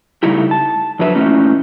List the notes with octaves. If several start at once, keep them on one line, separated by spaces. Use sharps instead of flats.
C#3 G3 A3 D#4 E4 G4
A5
F2 D3 F#3 B4 E5
A#2 E3 A3 C#4 D#4